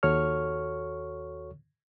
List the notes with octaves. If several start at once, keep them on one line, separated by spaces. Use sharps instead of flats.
D#2 F#4 A4 C#5 C#6 F6